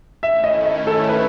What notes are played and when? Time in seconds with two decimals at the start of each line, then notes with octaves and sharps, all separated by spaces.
0.22 D#3 A3 C#4 E4 E5
0.44 D#5
0.66 D#5
0.87 A4
1.09 B4